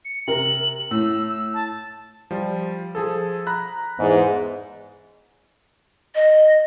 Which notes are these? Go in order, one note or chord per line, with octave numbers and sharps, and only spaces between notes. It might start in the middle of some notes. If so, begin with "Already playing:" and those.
C#7
C3 A#4 F#7
A2 E6
E6
A5
F3 G3
F3 G#4 A4
A#5 B5 F#6
E2 G#2 G#3
D#5